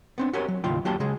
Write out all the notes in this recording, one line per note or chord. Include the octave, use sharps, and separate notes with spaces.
B3 C4 D4
F#4 G4 A#4 C5 C#5 G#5
F#3
D#2 A2 C#3 F4 G5
F#3 A#3 G4 C5 G5 A5
C#3 G#3 G#4